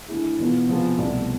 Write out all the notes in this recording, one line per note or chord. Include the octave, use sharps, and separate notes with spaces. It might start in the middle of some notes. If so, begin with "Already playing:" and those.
D3 A3 E4 G#4
E2 B2 B3 F4
C3 F3 B3 F4 G#4
C2 B2 A3